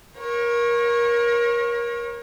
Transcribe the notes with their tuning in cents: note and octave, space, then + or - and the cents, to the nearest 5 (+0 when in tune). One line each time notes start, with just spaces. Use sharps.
A#4 +25 C#5 -25